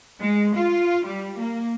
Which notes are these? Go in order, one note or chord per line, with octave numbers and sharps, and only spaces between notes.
G#3
F4
G3
A#3